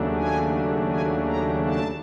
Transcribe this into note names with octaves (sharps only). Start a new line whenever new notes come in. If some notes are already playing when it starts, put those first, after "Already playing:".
Already playing: D#2 C#3 F#3 A3 D4
G#5
G#5
A#5
A5